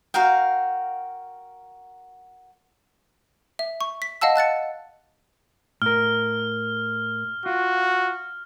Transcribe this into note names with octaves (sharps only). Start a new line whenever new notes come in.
F#4 A#4 F5 G5
E5
C#6
B6
D#5 F5 F#5 A5 E6
A5 F#6 A6 C#7
A2 A#4 F6
F4 F#4